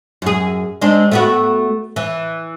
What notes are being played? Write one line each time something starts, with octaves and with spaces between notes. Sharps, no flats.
F#2 G#4
G#3 C4 D4
A3 B3 F#4
E3